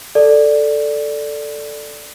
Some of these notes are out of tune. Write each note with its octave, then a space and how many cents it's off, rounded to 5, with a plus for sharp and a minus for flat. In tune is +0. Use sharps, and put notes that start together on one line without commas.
A4 +0 D5 +0